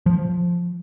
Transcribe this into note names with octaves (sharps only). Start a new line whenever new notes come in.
F3